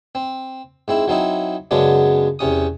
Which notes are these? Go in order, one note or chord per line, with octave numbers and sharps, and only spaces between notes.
C4
G#2 C4 E4
F#3 C4 D#4 E4
F#2 C#3 F#3 G#3 B3 D4
E2 C3 C#4 D#6